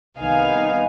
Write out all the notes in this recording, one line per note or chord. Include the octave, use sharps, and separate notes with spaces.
C2 C3 D#3 B3 D#4 F5 G#5